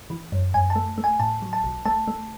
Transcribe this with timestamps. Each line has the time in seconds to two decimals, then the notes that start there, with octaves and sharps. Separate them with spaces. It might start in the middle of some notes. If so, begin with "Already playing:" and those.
0.10 E3
0.32 F#2
0.54 F#2 G#5
0.70 A5
0.76 A3
0.98 A3
1.04 G#5
1.20 A2 A5
1.42 F#3
1.53 A5
1.64 B1
1.85 A3 A5
2.08 A3